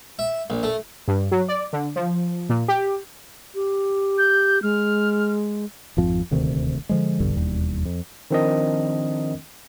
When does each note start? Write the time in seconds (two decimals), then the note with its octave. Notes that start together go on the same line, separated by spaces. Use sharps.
0.19 E5
0.50 A#1
0.63 A3
1.08 G2
1.31 F#3
1.48 D5
1.73 D3
1.96 F3
2.49 A#2
2.68 G4
3.55 G4
4.18 G6
4.62 G#3 F6
5.97 G#1 F2 F3 C4
6.31 D#1 D2 C3 D#3
6.89 D3 F3 G#3
7.20 E1 B1 G2 D3
7.35 E1 D#2 G3
7.85 F2
8.31 D#3 F3 C4 D4 A#4 D#5